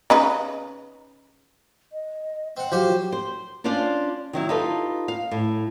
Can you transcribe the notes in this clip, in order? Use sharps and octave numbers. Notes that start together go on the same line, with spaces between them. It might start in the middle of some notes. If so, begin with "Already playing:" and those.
C#3 D#4 B4
D#5
C4 C5 F#5
F3 F#3 F#4 G4 C5
C5
C#4 D4 F4 C5 D5 F5
D#3 F#3 E4
D#4 F4 G4 A4 B4
F5
A2